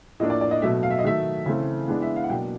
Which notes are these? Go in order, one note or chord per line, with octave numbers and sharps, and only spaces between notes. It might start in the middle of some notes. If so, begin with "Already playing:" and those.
A2 F3 A#3 D4 D#5
D5
D5
D#5
B2 F#3 A3 E5
F5
E5
D#5
D#3 F#3 A3 E5
C#3 E3 A3 C4
E3 G#3 B3 D4
E5
F5
F#5
B2 F#3 A#3 D4 G5